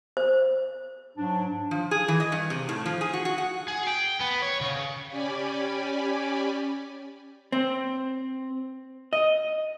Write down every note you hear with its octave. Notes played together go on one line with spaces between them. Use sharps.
C5
G#2 F#3 D4
F3
G#4
E3
D#5
G2
C3
A2
F3
G#4
F#4
F#4
F#5
G#4
G5
B3
C#5
C#3
C#4 G4 D5 G#5 B5
C4
D#5